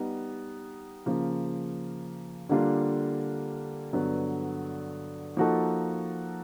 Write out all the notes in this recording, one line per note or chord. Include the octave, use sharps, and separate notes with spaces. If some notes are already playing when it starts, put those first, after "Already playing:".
Already playing: G3 B3 D#4
C#3 F3 A#3
D3 G3 A#3 D4 F4
G2 D3 F#3 B3
F3 A#3 D#4 F#4 A4